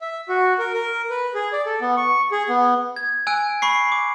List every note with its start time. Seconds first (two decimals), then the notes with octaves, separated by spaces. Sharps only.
0.01 E5
0.29 F#4
0.59 A#4
0.74 A#4
1.10 B4
1.35 G#4
1.53 D5
1.66 A4
1.81 B3
1.97 C#6
2.32 G#4
2.49 B3
2.96 G#6
3.27 G#5 E6 F#6 D7
3.62 B5 C#6 C7
3.92 D6